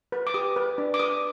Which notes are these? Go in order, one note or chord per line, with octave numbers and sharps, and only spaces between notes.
B4
D6
G4 D#6
B4
D4
D6
B4 D#6